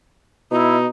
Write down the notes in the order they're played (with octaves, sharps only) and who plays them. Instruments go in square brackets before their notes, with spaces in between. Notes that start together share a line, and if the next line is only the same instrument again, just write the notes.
[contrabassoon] B2 [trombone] D#4 [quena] E4